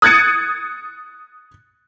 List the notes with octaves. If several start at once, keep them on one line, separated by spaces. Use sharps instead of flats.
D#6 F#6 G#6 A6 C#7 D#7